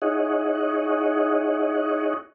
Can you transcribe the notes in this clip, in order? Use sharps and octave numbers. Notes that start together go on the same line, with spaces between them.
D#4 E4 G#4 C#5 D#5 F#5